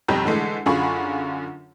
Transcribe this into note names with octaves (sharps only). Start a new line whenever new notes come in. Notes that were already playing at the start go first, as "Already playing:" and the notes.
B1 F2 G3 G4 A#5 G6
D3 E3 G#3 A3
F#2 D3 F4 G#4 B5 C#6